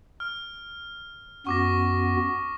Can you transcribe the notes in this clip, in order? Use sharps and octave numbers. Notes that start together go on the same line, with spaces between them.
F6
F#2 B3 F#4 C#6 D6 A#6